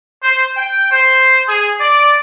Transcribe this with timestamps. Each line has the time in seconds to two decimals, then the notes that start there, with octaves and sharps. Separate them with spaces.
0.23 C5
0.57 G5
0.91 C5
1.47 G#4
1.79 D5